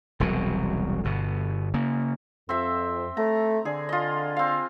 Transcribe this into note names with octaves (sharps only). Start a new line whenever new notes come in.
E1 C2 B2 F#3
G1 B2
C#3 A#3
F2 C4 E5
A3 A#5
D3 G#4
F4 D#5
C4 F5